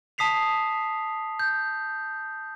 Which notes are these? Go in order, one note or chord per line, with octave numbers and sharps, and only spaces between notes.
A5 D#6 B6 C7 F7
G6